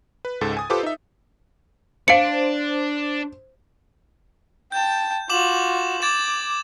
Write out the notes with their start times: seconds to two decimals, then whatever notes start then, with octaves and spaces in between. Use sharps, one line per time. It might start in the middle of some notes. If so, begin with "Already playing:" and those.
0.25 B4
0.41 C#2 G#2 A4 A6
0.57 G#5 D#6
0.70 F4 G4 A4 B4 C5 D6
0.83 D#4 E5
2.08 D4 C5 F5 C#7 D7
4.72 G5 A5 G6
5.30 F4 F#4 D6 E7 F#7
6.02 D6 G#6 A6 E7